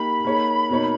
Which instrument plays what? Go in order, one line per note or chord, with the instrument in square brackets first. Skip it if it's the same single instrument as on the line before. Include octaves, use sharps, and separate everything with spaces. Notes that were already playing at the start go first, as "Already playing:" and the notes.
Already playing: [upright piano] A#3 D#4 G4 [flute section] B5
[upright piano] A#3 D#4 G#4 C#5
B2 A#3 D#4 A#4 C#5